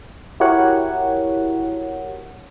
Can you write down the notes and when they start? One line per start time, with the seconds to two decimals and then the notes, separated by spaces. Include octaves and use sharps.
0.40 E4 F#4 G4 A#4 C#5 F#5